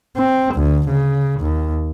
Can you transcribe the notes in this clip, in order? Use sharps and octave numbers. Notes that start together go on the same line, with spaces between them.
C4
D2
C#3
D#2